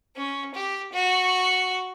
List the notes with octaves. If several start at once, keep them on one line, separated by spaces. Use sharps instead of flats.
C#4
G4
F#4